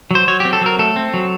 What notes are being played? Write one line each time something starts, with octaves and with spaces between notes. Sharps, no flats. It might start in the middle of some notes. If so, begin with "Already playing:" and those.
F#3 C5
F#3 C#5
G4
C4
A4
F#3 A#4
A3 A4
C4
F#3